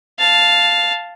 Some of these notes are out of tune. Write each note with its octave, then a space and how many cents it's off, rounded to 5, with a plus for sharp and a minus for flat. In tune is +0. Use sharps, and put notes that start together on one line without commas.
F5 +0 A5 +0